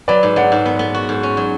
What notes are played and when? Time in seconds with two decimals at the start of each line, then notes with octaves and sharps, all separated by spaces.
0.08 F#3 B4 D5
0.23 G#2
0.36 F#3 D5 F#5
0.52 G#2
0.66 B3
0.79 B3
0.94 F#4
1.09 G#2
1.23 C#4
1.37 F#3